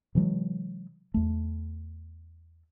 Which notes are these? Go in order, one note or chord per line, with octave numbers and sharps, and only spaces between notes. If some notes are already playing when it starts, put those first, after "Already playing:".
C3 E3 F#3 G#3
E2 A3